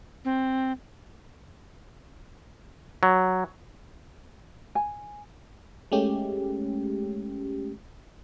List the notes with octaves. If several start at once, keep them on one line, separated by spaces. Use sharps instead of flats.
C4
F#3
G#5
G#3 A3 C#4 G4